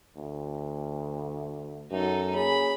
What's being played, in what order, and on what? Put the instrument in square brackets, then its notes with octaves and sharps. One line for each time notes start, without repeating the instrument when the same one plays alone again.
[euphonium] D2
[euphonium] F#2 [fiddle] D#4 A4
[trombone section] A#3 C#4 G#4 [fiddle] B5